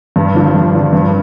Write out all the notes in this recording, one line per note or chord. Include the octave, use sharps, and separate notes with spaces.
G2
D3 F3 D4
G2
D3 F3 D4
G2